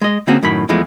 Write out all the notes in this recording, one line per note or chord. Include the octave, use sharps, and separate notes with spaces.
G#3 D#5
D3 A#3 C4 C#4 F#4 G#4
F#2 A2 D#3 B5
E2 E3 F3 G#3 A3